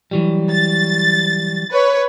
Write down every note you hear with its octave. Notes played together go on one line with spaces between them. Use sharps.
E3 F#3 G3
A6
B4 C#5